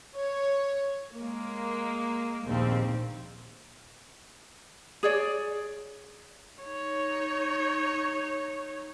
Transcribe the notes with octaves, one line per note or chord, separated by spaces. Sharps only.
C#5
G#3 A#3
A#1 D#2 C4
G#4 C#5 D5
D#4 C#5